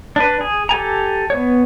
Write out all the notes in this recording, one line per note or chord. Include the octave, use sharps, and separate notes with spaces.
D4 B4
G#4
G4 A4 G#5 A#5
B3 C#5